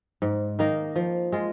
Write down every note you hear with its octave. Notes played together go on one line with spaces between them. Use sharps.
G#2
D#3 A#3 D#4
F3
G#3 F4